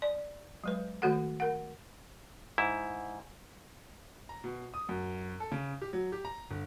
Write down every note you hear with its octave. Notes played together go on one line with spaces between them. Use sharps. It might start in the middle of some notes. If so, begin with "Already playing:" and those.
D5
F#3 G#3 B4
D#3 A3 F#4 A4 F#5
A#4 F#5
G#2 E4
A#5
B2
D#6
F#2
A4
C#3
G4
F#3
G4
A#5
G1